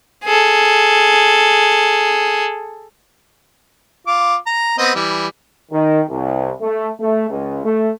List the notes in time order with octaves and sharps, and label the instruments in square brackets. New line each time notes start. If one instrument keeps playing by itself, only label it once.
[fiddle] G#4 A4
[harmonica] F4 D6
A#5
B3 C4 D#5
E3 G3
[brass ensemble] D#3
C2
A3
A3
C#2
A3